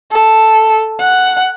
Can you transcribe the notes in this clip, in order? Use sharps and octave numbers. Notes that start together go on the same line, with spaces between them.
A4
F#5